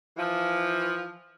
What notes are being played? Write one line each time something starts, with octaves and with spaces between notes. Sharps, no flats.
E3 F3